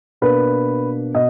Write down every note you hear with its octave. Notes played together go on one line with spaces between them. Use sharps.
B2 A#3 D4 B4
B2 D#5